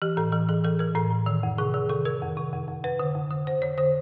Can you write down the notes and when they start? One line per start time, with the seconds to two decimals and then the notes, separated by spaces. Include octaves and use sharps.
0.02 E3 G4
0.17 A2 A4
0.32 E3 A4
0.49 E3 G#4
0.64 E3 A4
0.79 E3 A#4
0.95 A2 A4
1.11 A2
1.26 D#3
1.43 F2
1.58 C3 G#4
1.74 D#3 G#4
1.89 C3 A4
2.05 D#3 A#4
2.22 F2
2.37 C3
2.53 F2
2.68 F2
2.84 F2 B4
2.99 D3
3.15 F2
3.31 D3
3.47 F2 C5
3.62 D3 C#5
3.78 D3 C5